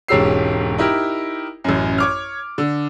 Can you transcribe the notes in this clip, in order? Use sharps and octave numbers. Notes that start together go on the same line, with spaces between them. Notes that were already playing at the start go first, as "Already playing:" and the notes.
E1 G#2 C#4 G4 E6 C7
D#4 E4 G4 A#4
A1 F#2
C#5 D6 F6
D3